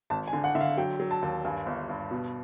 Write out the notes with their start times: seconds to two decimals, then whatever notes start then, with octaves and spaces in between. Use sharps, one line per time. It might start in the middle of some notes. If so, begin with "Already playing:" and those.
0.10 G#1 A5
0.27 G#5
0.33 D3
0.44 F#5
0.55 D3 E5
0.61 F5
0.78 F#3 G5
1.00 F#3
1.11 A5
1.22 D#2
1.45 G2 G#5
1.66 G1
1.89 G2
2.11 B2